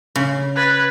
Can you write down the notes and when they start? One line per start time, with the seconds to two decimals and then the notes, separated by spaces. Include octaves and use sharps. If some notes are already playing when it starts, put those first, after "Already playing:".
0.16 C#3
0.56 B4 F#6 G#6 A6